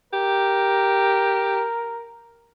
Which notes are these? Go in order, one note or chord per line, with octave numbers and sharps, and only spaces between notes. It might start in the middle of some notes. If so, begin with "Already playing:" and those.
G4 A#4